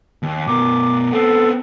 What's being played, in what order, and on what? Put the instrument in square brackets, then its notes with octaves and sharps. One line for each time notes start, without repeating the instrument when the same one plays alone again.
[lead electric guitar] D#2
[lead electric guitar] B2 A#4 [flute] D6
[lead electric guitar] B3 C4 [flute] A4